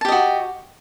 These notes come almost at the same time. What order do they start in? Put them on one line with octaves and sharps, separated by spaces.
A5 G4 D#5 F#4